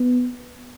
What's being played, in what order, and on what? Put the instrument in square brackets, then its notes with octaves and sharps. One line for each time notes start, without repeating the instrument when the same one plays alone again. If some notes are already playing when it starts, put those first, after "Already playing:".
Already playing: [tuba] B3